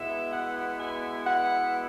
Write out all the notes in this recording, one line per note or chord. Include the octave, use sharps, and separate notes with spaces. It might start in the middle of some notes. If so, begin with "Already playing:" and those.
Already playing: B2 G#3 B3 E4 E5
F#5
G#5
F#5